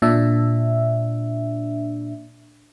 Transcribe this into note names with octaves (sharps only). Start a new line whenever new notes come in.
A#2 D4 E5